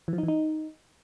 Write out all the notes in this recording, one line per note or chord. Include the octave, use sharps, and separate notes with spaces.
E3
F3
D#4
E3
D#4